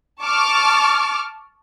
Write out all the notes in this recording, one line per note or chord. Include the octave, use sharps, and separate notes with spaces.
A5 C#6 D6 F6